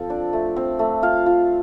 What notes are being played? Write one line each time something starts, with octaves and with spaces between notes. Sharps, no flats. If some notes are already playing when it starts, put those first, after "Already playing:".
Already playing: F3 C4 A4
D4 D5
A3
C4
A3
F4 F5
F4